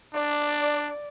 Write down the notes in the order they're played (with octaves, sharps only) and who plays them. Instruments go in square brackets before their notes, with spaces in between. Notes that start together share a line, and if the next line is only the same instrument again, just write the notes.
[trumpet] D4 [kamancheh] D5